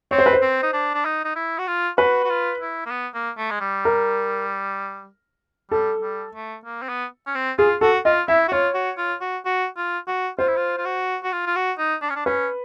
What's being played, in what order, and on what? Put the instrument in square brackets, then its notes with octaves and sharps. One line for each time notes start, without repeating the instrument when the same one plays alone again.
[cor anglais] C4 [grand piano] C#5
[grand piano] C5
B4
C5
[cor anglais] C4
D#4
D4
D4
D#4
D#4
E4
F#4
F4
[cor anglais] F#4 [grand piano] B4
[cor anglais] F#4
F4
E4
A#3
B3
A#3
A3
G#3
G3
[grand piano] A#4
[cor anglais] G3 [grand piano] A4
[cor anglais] G3
A3
A#3
C4
B3
C#4
C4
[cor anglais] F4 [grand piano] G#4
[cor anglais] F#4 [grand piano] A4
[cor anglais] F4 [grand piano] D#5
[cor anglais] E4 [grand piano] E5
[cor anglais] F#4
[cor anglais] F4 [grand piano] C#5
[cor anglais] F#4
F4
F#4
F#4
F4
F#4
[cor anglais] F4 [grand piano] C5
[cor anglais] E4
F4
F4
F#4
F#4
F4
F4
F#4
D#4
D4
C#4
D4
[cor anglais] C#4 [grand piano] B4